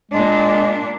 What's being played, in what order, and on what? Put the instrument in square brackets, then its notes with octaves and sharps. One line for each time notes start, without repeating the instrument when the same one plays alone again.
[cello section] A#2 D4 [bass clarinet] G#3